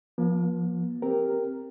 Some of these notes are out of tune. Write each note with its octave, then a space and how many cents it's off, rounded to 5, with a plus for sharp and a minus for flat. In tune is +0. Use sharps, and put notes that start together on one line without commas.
F3 +0 A#3 +45
C4 +0 G4 +0 A#4 +0